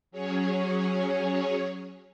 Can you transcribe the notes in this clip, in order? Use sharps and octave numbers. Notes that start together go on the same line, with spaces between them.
F#3 C#4 G#4 C#5